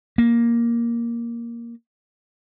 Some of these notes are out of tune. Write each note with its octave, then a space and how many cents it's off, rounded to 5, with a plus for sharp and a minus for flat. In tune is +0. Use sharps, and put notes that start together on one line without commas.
A#3 +5